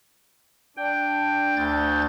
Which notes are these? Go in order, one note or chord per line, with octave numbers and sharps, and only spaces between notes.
D4 G5
D2 G6 A6